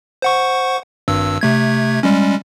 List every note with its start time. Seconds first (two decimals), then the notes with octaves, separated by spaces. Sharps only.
0.22 C5 F#5 C#6
1.08 G#1 G2 E6
1.41 C3 A3 G#6
2.03 G3 G#3 C#4